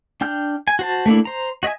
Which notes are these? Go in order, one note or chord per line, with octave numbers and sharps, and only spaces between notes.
D4 G5 F6 G6
G#5
F#4 C5 A5
A3 A#3 D4 E4
C5 A#5
F#4 D#5 E5 G#5